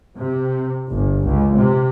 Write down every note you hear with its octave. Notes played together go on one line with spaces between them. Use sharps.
C3
G1
C#2
C3